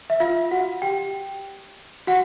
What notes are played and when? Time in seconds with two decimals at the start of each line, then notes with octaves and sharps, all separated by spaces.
0.10 E5
0.20 F4 F5
0.51 F#4 F#5
0.82 G4 G5
2.07 F#4 F#5